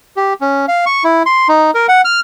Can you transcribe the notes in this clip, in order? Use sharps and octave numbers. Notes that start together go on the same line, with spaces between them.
G4
C#4
F5
C#6
E4
C6
D#4
A#4
F#5
F6